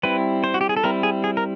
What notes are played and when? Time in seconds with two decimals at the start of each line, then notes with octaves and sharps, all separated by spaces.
0.03 G3 C4 E4 B4
0.44 C5
0.54 F#4
0.61 G4
0.69 G#4
0.77 A4
0.84 G3 C4 E4 A#4
1.03 G#4
1.24 G#4
1.37 A#4